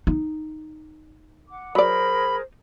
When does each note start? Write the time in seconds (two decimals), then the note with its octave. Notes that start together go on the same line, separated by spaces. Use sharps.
0.07 D#4
1.49 F#5 D6
1.75 F#3 G#4 A#4 C5 D5 B5